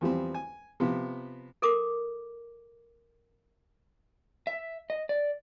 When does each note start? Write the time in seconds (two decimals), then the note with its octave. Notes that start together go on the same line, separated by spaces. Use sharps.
0.01 E2 F3 G3 B3 C4
0.34 G#5
0.80 C3 F3 B3
1.62 A4 A#4 D6
4.47 E5
4.90 D#5
5.09 D5